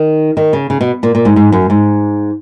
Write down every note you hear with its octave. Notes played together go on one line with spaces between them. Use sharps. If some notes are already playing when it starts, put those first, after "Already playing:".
Already playing: D#3
D#3
C#3
C#3
B2
A#2
A#2
G#2
G#2
F#2
G#2